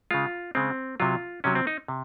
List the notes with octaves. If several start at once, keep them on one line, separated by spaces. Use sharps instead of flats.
C#3 G#3 F4
C#3 G#3 C4
C3 F#3 F4
C3 F#3 C#4
C4
D#4
C3